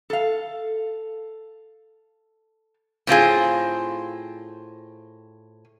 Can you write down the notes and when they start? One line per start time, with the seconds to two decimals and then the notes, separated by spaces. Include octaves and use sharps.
0.10 A4 F5
3.07 A2 C4 F4 G#4